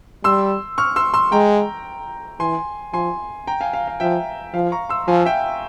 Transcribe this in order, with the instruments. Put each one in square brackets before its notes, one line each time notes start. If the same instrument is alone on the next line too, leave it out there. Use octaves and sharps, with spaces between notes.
[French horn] G3 [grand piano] C6 E6
[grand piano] C#6 F6
C6 E6
C6 E6
[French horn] G#3 [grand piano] G5 A#5
[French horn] E3 [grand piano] G#5 C6
[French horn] F3 [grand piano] G#5 C6
[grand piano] G5 A#5
F5 G#5
F5
F5
[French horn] F3 [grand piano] E5 G5
[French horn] F3 [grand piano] F5
[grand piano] A#5 C#6
C6 E6
[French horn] F3 [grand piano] F5 G#5
[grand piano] E5 G5